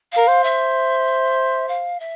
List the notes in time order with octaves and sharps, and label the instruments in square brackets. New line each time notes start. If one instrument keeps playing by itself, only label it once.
[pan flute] F5
[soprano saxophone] A#4
C5
[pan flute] E5
F5
E5